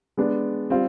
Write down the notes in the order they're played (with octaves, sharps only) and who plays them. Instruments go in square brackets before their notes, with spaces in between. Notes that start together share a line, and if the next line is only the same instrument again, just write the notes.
[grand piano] G#3 B3 D4
G3 C4 F4